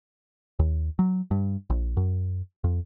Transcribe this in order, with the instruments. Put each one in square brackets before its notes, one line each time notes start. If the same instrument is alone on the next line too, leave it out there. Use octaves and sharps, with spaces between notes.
[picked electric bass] D#2
F#3
G2
A#1
F#2
F2